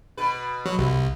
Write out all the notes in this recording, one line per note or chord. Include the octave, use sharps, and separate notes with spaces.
B2 B4
F#3
C2